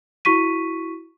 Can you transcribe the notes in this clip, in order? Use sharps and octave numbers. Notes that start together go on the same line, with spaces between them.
E4 F#4 C#6 B6 D#7